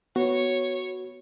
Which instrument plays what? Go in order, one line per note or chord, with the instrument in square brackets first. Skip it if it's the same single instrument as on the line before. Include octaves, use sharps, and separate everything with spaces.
[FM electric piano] B3 [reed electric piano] F#4 [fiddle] C#5